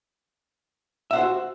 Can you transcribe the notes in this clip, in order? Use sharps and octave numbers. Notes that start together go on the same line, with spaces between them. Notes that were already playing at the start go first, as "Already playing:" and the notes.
F4 F#4 C5 E5 F#5